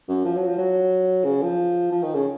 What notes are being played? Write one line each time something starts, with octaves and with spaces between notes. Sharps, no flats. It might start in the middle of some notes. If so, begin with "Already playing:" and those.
F#2
F3
F#3
F3
F#3
C#3
F3
F3
D#3
C#3